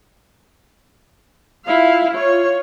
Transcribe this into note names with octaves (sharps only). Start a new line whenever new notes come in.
E4 F4 F5
F4 C#5